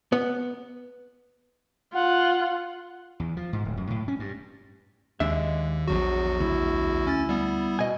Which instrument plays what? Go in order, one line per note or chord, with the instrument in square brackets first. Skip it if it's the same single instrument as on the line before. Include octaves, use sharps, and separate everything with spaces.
[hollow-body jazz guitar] B3
[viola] F4 [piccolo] F#5
[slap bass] E2
F3
G#2
D1
F#2
A2
C#4
G2
[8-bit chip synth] D#2 [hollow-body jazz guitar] D#3 D4 E5 [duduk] G#3
[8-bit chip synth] A#1 E2 F#4 [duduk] F#3
[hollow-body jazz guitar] D2 [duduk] E4
[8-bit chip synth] C#4 A6
G3 B3
[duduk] B2 [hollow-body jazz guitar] D#5 G#5